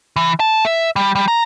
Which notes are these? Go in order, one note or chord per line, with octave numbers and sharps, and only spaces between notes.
E3
A5
E5
G3
G3
A#5